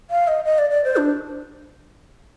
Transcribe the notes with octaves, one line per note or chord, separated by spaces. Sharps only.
F5
D#5
D#5
D5
D5
C5
D4